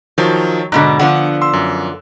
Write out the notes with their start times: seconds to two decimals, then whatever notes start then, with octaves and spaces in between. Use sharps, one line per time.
0.18 D#3 F3 F#3
0.72 G#2 B2 D3 A#5 F#6
0.99 D3 F3 B3 F#5
1.42 C6 E6
1.53 F#2